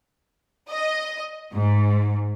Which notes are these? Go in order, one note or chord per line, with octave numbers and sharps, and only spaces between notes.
D#5
G#2